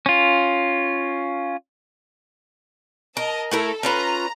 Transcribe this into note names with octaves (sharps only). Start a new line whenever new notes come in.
C#4 F4
A#4 D#5 A5
A3 E4 A4 A#4
C#4 F4 B4 A#5